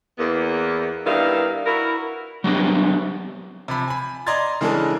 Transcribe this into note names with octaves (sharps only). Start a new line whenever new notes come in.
E2 A#3 B3
G2 D#3 G3 B3 E4 F5
E4 F#4 A#4
F#3 G3 B3 C4 D4 G4
C3 F3 B5
G#5 B5
D5 D#5 A#5 C6 G#6 A6
C#3 E3 G#3 D4 A4 A#4